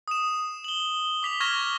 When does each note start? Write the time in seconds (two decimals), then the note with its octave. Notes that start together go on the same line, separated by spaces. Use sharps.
0.08 D#6 E7
0.64 F#7 G7
1.23 D6 B6 F7 G7
1.40 C#6 F6 G#6 A#6 E7 G7